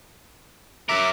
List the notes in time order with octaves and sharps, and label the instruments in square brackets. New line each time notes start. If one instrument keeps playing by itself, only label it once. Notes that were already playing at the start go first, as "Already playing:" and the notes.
[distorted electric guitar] F#3 A#4 [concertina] E5 D6